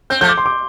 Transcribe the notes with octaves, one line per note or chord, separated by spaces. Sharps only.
C4 G6
F3 A3 G6
D6
C6
D6